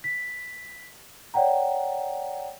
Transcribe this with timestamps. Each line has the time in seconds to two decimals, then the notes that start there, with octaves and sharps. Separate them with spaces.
0.04 B6
1.34 C#5 D5 F#5 G5 A#5